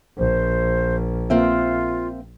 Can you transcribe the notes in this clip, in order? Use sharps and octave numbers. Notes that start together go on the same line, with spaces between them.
A#1 C5
A#3 C4 F4 E5